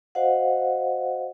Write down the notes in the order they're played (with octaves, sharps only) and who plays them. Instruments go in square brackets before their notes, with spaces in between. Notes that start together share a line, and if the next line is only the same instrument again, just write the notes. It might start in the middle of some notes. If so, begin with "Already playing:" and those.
[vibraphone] F#4 C5 D#5 F5 F#5